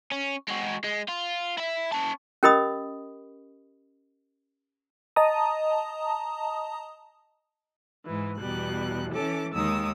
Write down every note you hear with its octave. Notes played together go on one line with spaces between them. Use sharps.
C#4
G#3 F#4
G#3
F4
E4 E5
C#4 A5
C#4 G4 A#4 D#5 B5 D#6
D#5 A5 A#5 D#6
G#2 E3
E2 B2 G3 F#6
E3 C#4 A4 D6
D#2 D#3 G#3 D#6 E6